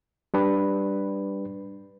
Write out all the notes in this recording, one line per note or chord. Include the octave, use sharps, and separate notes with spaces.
G3 D4 B4